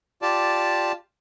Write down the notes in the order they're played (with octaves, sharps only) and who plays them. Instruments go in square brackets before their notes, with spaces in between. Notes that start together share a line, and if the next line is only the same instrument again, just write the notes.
[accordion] F4 G4 D5 A5